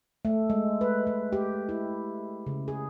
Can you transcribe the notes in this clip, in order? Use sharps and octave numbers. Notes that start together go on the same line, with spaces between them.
A3
G#3
B4
G#3
G4
E4
C#3
G#4